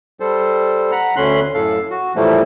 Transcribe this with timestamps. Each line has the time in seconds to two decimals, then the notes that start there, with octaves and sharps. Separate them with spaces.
0.20 G3 A4 C5
0.91 F#5 A#5 B5
1.16 D2 D3 C#4 B5 C6 F#6
1.54 F#2 A2 A4 F5
1.91 F#4
2.16 A2 E3 F3 G3 A3 A#3